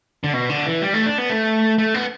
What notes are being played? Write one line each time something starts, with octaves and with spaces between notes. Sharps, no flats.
D3
B2
D3
E3
G3
A3
D4
B3
A3
A3
B3